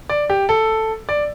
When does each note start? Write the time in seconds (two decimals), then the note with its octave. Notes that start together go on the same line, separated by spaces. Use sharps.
0.09 D5
0.30 G4
0.49 A4
1.09 D5